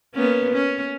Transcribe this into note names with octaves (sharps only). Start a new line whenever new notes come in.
A#3 B3 C#4
C#4